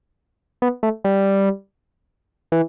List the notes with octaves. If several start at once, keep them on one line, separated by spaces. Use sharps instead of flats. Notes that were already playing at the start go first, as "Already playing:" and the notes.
B3
A3
G3
E3